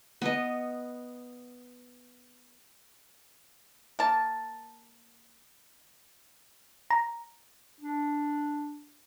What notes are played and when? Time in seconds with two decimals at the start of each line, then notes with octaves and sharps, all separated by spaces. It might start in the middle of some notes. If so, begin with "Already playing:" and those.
0.21 B3 D#5
3.99 A#3 A5
6.91 A#5
7.81 D4